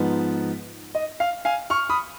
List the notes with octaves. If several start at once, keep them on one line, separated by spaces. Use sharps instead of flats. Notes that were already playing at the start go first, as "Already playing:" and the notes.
Already playing: G#2 F3 B3 D#4
D#5
F5
F5 G#5
C#6 F6
B5 D#6